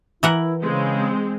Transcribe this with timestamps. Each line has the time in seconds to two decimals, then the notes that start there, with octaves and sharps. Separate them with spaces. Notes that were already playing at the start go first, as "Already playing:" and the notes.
0.23 E3 E4 A#4 F#5
0.62 C#3 G#3 C4